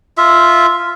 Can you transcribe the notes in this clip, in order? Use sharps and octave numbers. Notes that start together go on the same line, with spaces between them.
F4 E5